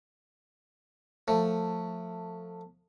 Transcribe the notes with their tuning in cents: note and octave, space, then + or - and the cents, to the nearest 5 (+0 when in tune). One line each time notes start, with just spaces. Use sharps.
F3 +25 A3 +15